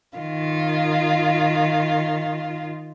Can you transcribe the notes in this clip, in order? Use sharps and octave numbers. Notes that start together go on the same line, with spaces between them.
D#3 F4